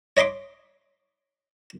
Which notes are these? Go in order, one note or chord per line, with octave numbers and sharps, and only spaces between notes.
C#5 D#5 B5 C6 D6